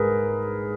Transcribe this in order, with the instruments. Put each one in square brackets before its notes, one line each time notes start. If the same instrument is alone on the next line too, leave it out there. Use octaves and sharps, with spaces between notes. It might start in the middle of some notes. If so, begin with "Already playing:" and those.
Already playing: [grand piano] G#2 G#4 A#4 B4